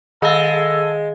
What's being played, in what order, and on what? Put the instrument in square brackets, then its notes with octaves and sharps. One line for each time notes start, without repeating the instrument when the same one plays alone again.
[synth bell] D#3 F5 [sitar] G#3 [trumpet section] A4 [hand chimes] D#5